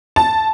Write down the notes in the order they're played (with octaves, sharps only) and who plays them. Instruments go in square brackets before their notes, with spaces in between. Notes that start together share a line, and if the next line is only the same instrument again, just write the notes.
[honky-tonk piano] A5